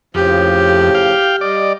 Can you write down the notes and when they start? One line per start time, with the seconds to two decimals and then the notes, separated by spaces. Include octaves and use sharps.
0.15 F2 A2 C#3 F3 G4
0.94 F5 G5
1.41 G3 D5 D#5